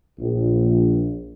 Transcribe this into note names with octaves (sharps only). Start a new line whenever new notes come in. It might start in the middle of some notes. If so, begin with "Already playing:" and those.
A#1